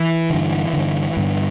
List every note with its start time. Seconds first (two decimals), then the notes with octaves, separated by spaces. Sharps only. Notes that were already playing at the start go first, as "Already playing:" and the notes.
Already playing: E3
0.30 G2 D3
0.73 G2 D3
1.17 G2 D3